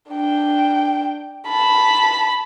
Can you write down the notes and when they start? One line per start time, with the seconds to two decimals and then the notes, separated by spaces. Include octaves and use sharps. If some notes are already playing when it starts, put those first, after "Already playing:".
0.11 D4 G5
1.49 A5 B5